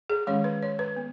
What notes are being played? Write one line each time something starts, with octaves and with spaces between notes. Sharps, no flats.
G#4
D#3 G#3 C#4 C#5
B4
C#5
B4
B3